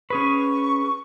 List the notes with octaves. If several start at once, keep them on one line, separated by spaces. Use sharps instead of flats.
C#4 G#4 B4 C#6